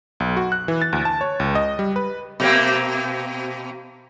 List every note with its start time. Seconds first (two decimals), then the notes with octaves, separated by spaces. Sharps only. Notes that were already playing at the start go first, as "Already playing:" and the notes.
0.20 B1
0.37 F#4
0.52 F#6
0.68 E3
0.82 A6
0.93 D2
1.05 A5
1.21 C#5
1.40 C#2
1.55 D#5
1.79 G3
1.96 B4
2.40 B2 A#3 C4